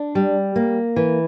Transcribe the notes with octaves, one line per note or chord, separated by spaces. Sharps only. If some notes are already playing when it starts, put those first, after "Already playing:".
Already playing: D4
G3
A#3
E3